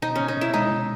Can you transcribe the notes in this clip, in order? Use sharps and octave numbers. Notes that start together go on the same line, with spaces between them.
B2 D#4
B2 C#4
D#4
B2 E4
G#3 D#4
B2